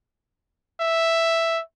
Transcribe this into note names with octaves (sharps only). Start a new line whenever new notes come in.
E5